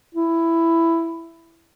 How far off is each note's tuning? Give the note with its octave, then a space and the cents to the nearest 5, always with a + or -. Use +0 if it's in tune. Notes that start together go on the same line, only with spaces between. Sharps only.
E4 +10